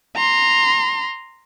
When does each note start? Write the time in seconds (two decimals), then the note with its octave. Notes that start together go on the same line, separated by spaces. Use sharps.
0.16 A#5 C6